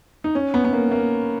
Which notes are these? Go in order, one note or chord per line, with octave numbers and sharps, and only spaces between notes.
D#4
C#4
B3
B3
A#3
A#3